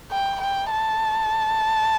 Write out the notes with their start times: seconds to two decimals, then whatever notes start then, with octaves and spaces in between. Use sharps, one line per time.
0.11 G5
0.41 G5
0.71 A5